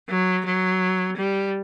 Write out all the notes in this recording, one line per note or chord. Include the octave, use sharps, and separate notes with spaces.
F#3
F#3
G3